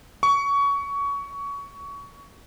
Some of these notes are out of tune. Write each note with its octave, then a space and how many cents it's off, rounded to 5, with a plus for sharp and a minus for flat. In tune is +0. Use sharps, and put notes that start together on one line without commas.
C#6 +20